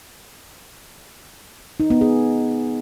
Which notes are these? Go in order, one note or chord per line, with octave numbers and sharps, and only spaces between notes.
D#4
B3
G#4